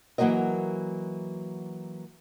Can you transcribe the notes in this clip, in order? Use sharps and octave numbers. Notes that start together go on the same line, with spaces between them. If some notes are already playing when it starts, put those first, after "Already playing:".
E3 F#3 A#3 F#4 A#4 D#5